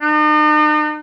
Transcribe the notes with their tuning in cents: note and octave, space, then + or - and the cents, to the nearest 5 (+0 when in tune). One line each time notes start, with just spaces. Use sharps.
D#4 -45